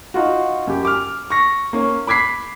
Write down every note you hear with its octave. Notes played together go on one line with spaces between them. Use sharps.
D#4 F4 F#4
F#2 G4
D6 F6
C#6 A#6
A#3 C#4
B5 D6 G#6 B6 C7